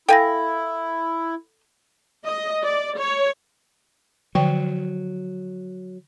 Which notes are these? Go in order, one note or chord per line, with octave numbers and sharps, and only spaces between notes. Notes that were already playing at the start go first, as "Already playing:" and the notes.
E4 A4 F5 G5 G#5 A#6
D#5
D5
C#5
D3 F3 F#3 G5